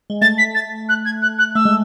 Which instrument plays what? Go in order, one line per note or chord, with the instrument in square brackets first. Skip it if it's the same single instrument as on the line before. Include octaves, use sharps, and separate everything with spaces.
[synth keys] G#3
[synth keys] A3 [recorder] A6
[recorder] B6
A6
F#6
G#6
F#6
F#6
[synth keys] A3 [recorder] E6
[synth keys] G#3